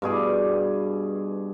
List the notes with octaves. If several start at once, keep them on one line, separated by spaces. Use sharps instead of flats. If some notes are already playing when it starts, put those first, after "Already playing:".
G2 B2 G#4 D6